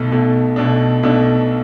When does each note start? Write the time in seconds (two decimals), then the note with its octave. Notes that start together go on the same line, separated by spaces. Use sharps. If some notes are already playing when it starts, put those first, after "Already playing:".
Already playing: B1 B2 A3
0.11 B1 B2 A3
0.56 B1 B2 A3 D4
1.03 B1 B2 A3 D4